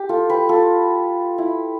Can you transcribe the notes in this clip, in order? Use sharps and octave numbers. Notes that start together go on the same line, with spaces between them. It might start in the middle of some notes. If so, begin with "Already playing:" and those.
Already playing: G4
F4 A4
G4 B4
F4 A4
E4